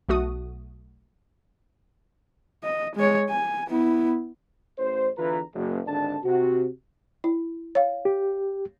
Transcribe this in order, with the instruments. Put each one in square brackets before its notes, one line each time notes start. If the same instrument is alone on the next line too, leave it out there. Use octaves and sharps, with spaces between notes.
[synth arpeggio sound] B1 A3 F#4 D#6
[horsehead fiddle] D#5
G#3 C#5
G#5
B3 E4
[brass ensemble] A1 C5
E2 D3 E3 F4 B4 A#5
F#1
G#1 D3 D4 A4 D5 A5
C3 F#4
[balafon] E4
C#5 F5
[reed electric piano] G4